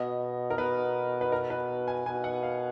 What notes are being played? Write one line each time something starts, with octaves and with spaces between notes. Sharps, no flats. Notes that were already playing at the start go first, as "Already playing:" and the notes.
Already playing: B2 D#5
A#4
B2 B4
B4
A#4
B4
G#5
B2 G#5
F#5
F5